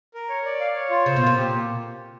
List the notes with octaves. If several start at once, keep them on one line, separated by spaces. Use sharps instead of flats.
A#4
C#5
D5
F5
C#5
F4
C#3 C5
B2
F4
A#2
G4